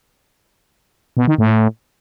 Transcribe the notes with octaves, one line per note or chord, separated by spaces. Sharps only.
B2
D#3
A2